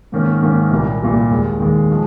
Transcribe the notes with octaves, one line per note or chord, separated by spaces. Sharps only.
G#2 D#3 A#3 C#4
G#2 D#3 A#3 C#4
C2 A#2 G3 A#3
C2 A#2 G3 A#3
D#2 D#3 G#3
D#2 D#3 G#3
F3 G#3